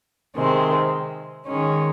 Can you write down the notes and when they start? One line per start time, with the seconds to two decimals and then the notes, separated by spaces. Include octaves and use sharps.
0.35 C3 D#3 G#3 C4
1.46 D#3 G#3 C#4